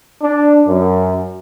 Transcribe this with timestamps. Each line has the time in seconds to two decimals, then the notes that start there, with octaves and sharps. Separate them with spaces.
0.22 D4
0.67 F#2